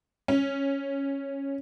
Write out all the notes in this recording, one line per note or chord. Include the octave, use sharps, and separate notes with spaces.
C#4